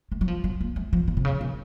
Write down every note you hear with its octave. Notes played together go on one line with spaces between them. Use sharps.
A3
F#3
F3
F#3
A#3
A3
F3
D#3
C3
C#3
D#3